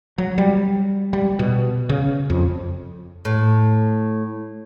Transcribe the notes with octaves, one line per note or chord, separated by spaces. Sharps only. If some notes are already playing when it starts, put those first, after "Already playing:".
F#3
G3
G3
B2
C#3
F2
A2